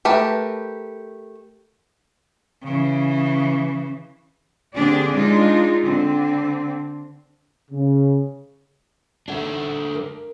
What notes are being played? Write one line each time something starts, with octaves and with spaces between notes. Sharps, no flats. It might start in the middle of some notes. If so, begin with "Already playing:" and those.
A3 G4 A#4 B4
C#3 E3
D3 C4 D4 G4 G#4 D5
G#3 D4 D#4 F4
D3 C4
C#3
D4 A4 C5 C#5 E5 F#5
A#4